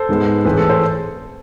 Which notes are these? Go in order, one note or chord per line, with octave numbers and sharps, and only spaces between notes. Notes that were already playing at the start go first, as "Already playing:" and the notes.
Already playing: A4 C5
G#2 G#3 B3
A2 E3 A3 C4 G#4 B4
A4
A4 C5